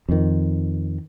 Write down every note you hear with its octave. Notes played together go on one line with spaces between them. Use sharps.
F2 D#3